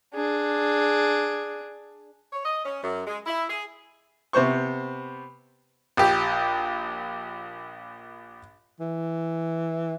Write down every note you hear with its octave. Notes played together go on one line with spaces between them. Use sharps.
D4 G#4
C#5
D#5
C#4
F#2
G#3
E4
G#4
C3 B3 C5 C#6
A#1 G4
E3